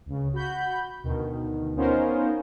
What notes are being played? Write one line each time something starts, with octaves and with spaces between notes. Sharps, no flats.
C#2 C#3
F#4 B5 G6
D2 B2 D#3
B3 C#4 D#4 F4 A#4 C5